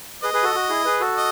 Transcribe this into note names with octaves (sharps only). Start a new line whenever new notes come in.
G#4 B4 D#5
G#4 B4
F#4 A4
F#4
E4 G#4
G#4 B4
F#4 A4
D#5